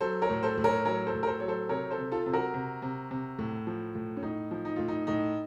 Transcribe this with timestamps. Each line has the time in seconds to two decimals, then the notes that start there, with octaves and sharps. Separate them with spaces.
0.01 F#3 A4 C5
0.22 A#4 C#5
0.30 A2
0.43 A4 C5
0.58 A2
0.64 A#4 C#5
0.85 F#3 A#4 C#5
1.07 A4 C5
1.14 A2
1.23 A#4
1.27 A4 C5
1.40 F#3 C#5
1.48 A4 C5
1.69 C3 A#4 C#5
1.91 A4 C5
1.98 C3
2.12 F4 A4
2.26 C3
2.33 F#4 A#4
2.54 C3
2.82 C3
3.11 C3
3.39 A2
3.67 F3
3.95 A2
4.17 C#4
4.22 A2 D#4
4.51 F3
4.65 D#4
4.76 A2 F4
4.88 D#4
5.07 A2 D#4